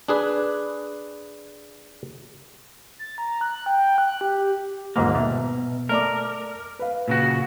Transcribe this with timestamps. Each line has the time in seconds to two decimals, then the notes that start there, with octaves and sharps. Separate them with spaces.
0.08 D4 G#4 B4 D5
2.99 A6
3.18 A#5
3.41 F#6
3.66 G5
3.98 F#6
4.21 G4
4.96 D#1 G#2 A#3 F#5
5.15 B2 E5
5.89 A3 A#4 D5 D6
6.79 B4 F5
7.08 A#2 C#3 F#4